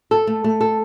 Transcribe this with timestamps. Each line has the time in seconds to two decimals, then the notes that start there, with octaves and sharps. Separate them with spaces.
0.11 A4
0.27 A3
0.44 A3
0.61 A4